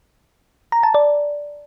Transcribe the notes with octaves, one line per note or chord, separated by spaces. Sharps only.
A#5
A5
D5